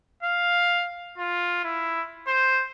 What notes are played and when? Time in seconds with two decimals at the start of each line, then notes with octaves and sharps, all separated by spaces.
0.23 F5
1.18 F4
1.64 E4
2.27 C5